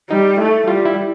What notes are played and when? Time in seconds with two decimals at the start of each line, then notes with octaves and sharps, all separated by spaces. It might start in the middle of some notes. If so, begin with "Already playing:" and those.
0.10 G3 D#4
0.38 A3 E4
0.67 G3 F4
0.85 E4